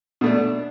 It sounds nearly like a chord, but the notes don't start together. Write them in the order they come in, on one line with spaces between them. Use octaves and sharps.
B2 A3 D4